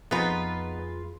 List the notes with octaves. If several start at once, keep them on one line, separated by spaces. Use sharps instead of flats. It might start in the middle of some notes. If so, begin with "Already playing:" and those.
F2 B3 D#4 F4 G#4 B4 C6